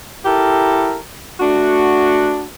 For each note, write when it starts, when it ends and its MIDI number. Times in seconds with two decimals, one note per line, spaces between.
0.25 0.99 64
0.25 0.99 67
0.25 0.99 69
0.25 0.99 70
1.39 2.47 57
1.39 2.47 62
1.39 2.47 66